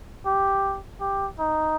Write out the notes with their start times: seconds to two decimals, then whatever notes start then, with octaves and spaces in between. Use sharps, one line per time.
0.26 G4
1.01 G4
1.39 D#4